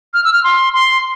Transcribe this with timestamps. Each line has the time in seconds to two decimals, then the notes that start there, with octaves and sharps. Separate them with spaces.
0.14 F6
0.24 E6
0.33 F6
0.44 C6
0.73 C6